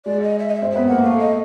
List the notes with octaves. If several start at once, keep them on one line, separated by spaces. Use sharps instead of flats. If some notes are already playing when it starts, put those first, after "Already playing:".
G#3 D5
D#5
E5
D#5
E5
C4
B3 E5
A#3 F#5
A3 F5
D#5